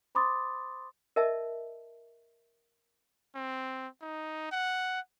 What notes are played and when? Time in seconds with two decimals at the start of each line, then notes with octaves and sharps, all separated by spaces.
0.15 C5 B5 C6 D6 D#6 A6
1.16 A#4 D#5 E5 A5
3.35 C4
4.02 D#4
4.52 F#5